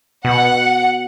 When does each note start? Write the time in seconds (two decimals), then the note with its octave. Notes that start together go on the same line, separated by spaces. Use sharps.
0.25 B2 F#5